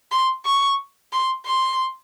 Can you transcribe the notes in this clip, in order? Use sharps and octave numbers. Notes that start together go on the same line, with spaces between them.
C6
C#6
C6
C6